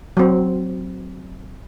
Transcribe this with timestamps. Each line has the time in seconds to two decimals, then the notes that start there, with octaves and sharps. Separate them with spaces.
0.17 F#3 C4